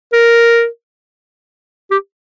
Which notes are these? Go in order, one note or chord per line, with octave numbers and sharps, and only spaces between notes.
A#4
G4